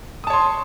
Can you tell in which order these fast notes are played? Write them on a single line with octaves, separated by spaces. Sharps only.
D#6 A5 C#5 C6